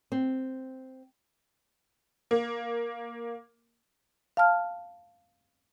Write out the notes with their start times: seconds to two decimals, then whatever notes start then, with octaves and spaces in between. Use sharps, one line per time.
0.12 C4
2.31 A#3
4.37 F5 A5 F6